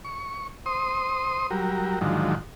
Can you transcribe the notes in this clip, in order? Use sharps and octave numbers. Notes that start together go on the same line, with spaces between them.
C#6
C5 C6 D#6
F#3 G3 A#4
G#2 D3 D#3 F3 F#3